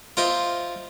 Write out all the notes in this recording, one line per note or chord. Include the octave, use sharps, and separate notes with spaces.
F4 A#4 C5 D#5 E5